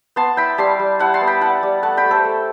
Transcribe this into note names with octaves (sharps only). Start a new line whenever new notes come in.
B3 A5 C6
E4 G5 B5
G3 A5 C6
G3
E4 F#5 A5
A5 C6
B3
G5 B5
E4 F#5 A5
G3
A3 F#5 A5
G5 B5
A3
A4 C5
A3